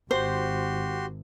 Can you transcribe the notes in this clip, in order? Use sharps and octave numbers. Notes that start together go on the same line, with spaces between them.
G#1 F#4 G4 C5 C6